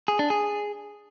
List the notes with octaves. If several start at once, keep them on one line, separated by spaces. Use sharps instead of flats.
G#4
D4
G#4